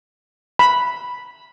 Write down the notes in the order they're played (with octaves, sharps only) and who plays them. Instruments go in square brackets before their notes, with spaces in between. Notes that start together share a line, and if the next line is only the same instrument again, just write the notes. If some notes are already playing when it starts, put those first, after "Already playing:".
[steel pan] B5